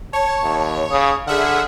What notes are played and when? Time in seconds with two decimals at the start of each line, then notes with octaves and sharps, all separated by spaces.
0.13 C#5 A5
0.43 D#2
0.91 C#3 D#6
1.27 D3 G#4 E5 F#5 F6